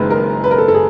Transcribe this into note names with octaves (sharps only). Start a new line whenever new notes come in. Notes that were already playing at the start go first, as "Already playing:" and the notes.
Already playing: F#1 F#2 D#3 G#3 B4
A#4
B4
A#4
A4
A4
G#4